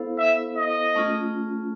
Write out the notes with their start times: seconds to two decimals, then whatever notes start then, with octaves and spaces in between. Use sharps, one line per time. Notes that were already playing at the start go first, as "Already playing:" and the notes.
Already playing: B3 E4 A4 C5 F5
0.18 E5
0.57 D#5
0.95 A3 C#4 F4 G#4